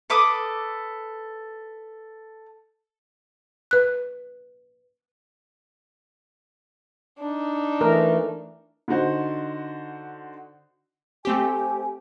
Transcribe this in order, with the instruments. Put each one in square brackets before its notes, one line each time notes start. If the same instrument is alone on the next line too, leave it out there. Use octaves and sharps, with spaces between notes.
[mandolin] A4 B4 D6 D#6
[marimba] B4 F#6
[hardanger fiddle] D4 D#4
[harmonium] E3 A3 [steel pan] A#4
[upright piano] D3 D#4 F#4 C5
[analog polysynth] A3 C4 G4 [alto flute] G#5